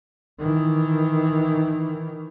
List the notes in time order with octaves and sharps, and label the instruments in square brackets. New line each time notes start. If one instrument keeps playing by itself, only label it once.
[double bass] D#3 E3